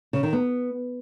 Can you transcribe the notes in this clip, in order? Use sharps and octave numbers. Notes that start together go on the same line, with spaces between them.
C#3
D#3
B3